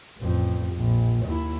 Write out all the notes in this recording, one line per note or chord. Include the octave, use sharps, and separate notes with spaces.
A1 F2
A#1
D#2 E4